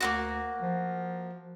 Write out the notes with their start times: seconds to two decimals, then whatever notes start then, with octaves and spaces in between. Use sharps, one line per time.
0.01 D2 A#3 C4 F#4
0.62 F3